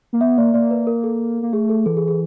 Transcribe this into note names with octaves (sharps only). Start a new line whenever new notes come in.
A#3
B3 E5
A#3 D5
A#3 D5
B4
A#4
A4
A#3
A3 G#4
A4
E3 A4
G#4
G#4